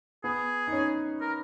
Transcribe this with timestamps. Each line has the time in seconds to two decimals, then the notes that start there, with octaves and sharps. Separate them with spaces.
0.24 B3 G#4
0.68 D#4
0.73 C#4
1.21 A#4